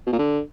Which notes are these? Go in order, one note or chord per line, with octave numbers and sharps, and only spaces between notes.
B2
A#2
D3